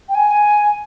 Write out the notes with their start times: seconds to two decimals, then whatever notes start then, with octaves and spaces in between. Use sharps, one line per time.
0.09 G5
0.15 G#5